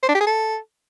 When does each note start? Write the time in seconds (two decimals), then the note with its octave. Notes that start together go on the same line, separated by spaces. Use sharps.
0.03 C5
0.09 D4
0.15 G4
0.21 G#4
0.27 A4